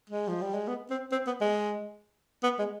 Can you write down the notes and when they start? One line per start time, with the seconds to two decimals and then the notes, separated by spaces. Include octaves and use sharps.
0.09 G#3
0.28 F3
0.41 G3
0.54 G#3
0.68 B3
0.90 C4
1.12 C4
1.27 B3
1.41 G#3
2.43 B3
2.59 G#3